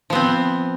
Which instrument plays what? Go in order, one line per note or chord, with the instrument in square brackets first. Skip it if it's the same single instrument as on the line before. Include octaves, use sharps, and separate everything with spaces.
[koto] F3
B3
C4